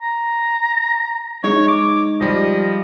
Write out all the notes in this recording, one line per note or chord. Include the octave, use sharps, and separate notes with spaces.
A#5
G#3 D#4 C#5
D6
F3 G3 D#5